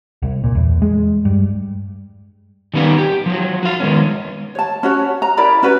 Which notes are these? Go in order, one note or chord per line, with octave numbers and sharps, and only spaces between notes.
C2
A#2
E2
G#3
G2
D#3 G3 B3 C#4 F5
G4
F3 F#3
F#4 F5
D#3 G#3 B3 C#4
C#5 A5
C#4 F#4 C#5
A#5
E4 A#4 D5 B5
C#4 F#4 B4